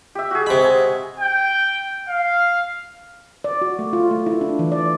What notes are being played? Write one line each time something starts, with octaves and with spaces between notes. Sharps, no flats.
G4 E5
F#4 G#4
C3 G#3 G#4 B5
G5
F5
D5
F#4
A3
F4
A3
E4
D4
E3
D5